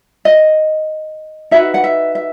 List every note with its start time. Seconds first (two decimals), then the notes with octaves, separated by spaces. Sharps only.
0.25 D#5
1.51 D#4 F#4 B4 E5
1.74 F#5
1.84 E5
2.15 E5